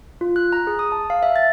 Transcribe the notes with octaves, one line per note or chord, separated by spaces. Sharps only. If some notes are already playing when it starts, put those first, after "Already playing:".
F4
F#6
A#5
G#4
D#6
A5
F5
E5
A6